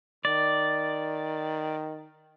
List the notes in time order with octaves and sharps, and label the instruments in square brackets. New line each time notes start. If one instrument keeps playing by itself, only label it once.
[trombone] D#3 [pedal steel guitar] D5